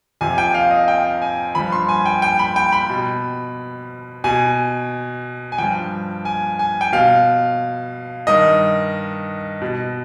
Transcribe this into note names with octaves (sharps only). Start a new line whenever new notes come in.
F2 C3 F3 G#5
G5
F5
D#5
G5
G#5
G2 F3 B5
C6
G#5
G5
G5
B5
G5
B5
B2
B2 G#5
G#5
G2 F3 G5
G#5
G#5
G5
B2 F5
G2 D#3 D#5
B2